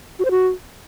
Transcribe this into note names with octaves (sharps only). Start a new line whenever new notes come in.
F#4
C5
F#4